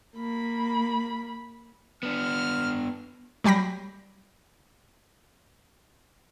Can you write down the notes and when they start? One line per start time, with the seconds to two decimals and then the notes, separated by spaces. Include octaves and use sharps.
0.16 A#3 B5
2.03 B3 D4 F6
3.44 F#3 G3 G5 B5 A#6